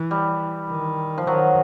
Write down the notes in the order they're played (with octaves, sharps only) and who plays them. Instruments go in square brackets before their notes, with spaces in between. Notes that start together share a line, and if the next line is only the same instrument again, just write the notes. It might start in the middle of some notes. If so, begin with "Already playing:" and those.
Already playing: [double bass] E3
[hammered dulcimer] G3
[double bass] D#3
[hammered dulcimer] F3
[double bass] D#3 [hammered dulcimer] F#3